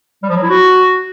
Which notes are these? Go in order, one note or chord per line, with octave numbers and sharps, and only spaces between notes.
G3
F3
F#3
E4
F#4